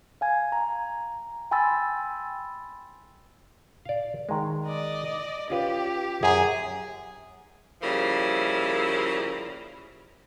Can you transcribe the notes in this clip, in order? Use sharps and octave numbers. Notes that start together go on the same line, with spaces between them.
F5 G#5 G#6
A#5
G5 G#5 B5 C6 E6 A6
D5 F5
D#3 G#3
D5 D#5
C#4 F4 G4 B4
F#2 G#4
C#3 F3 G3 A#3 E4